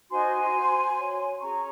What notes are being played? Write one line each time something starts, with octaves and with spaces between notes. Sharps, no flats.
D#4 F#4 C5 G#5 C6
F#4 C5
F#4 C#5
C#4 G#4 C#5 A#5 C#6